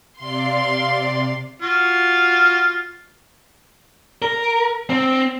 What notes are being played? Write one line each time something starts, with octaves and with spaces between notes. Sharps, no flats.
C3 D5 F5 C6
F4 F#4
A#4
C4